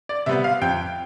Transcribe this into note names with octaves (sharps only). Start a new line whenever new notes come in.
D5
C3 G3 B3 E5
F5
F2 G5